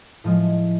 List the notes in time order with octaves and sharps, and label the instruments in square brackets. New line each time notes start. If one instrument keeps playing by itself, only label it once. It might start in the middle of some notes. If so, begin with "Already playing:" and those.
[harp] A2 F3 G#3